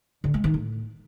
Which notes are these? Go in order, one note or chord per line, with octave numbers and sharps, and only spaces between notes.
D3
G#3
D#3
A2